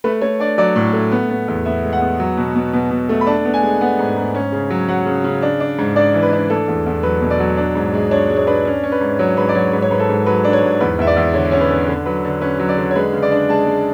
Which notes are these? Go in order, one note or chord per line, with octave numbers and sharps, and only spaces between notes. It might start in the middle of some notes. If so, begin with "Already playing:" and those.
A3 B4
A3 C#5
D4 D5
F#3 D5
A2
A3
B3
B3
E2
B3 E5
G#3
F#5
B3
F#3
B2
B2
B2
B2
A3
B5
D4 A5
B3
G#5
G#3
B3 F#5
G#2
G#2
C#4
C#3
F#3
F#3 F#5
C#3
C#3
D4
D4
G#2
D4 D5
E3
B4
D4
A3 A4
E2
E2
F#3 B4
B2
D5
F#3
D4
G#2
G#3
D4 C#5
G#3
C#5
D4 B4
C#4
C#4
B4
G#2
F#3 C#5
G#2 B4
D5
F#3 C#5
G#2 B4
C#5
G#2 B4
A4
G#2
F#3 B4
D4
C#5
G#2
E2 B4
E2 E5
D5
E2
D3 C#5
C#4 C#5
B4
D3
D3 B4
F#3 B4
D3
C#4 B4
F#3
D5
D3
C#5
G#3 B4
C#3
D5
D4
G#3 A5
G#3